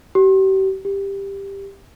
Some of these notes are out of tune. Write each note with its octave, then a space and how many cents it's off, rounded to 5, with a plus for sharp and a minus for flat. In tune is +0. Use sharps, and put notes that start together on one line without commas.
G4 -40
G4 +10